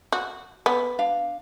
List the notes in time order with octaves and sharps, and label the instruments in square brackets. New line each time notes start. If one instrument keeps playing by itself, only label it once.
[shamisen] F#4
B3
[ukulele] D4 F5